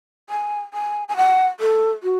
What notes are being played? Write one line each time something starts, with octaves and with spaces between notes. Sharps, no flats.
G#5
G#5
G#5
F#5
A4
F#4